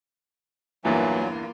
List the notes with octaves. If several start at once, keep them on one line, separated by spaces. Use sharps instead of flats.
E2 G2 A#2 E3 F#3 A#3 F4